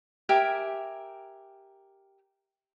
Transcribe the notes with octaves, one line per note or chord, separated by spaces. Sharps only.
G4 A#4 E5 G#5